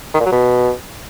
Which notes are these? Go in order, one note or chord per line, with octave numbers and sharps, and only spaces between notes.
D#3
A#2
F#3
B2